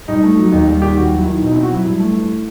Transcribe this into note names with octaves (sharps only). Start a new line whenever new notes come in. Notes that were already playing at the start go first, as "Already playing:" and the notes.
G2 D#4
A3
F#3
D#2 D#4
G3
D#3 G4
D#2 F#4
F#3
E4
D#3
B2
D#4
C4 E4
F#4
F#3 E4
G2 E4
A3
E3